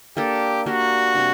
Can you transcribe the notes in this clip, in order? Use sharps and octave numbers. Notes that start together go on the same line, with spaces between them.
A#3 D4 G4 A4
A#3 D4 F#4 G4
C3 G3 D4